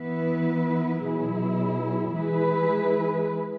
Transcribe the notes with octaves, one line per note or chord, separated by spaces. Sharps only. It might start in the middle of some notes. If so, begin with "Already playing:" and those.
Already playing: E3 B3 E4 B4
B2 F#3 E4 G#4
E3 G#3 E4 G#4 B4